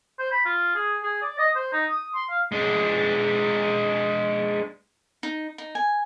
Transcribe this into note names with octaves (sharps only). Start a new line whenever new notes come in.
C5
B5
F4
G#4
G#4
D5
D#5
C5
D#4
D#6
C6
F5
G#3 D4
D#4
D#4
G#5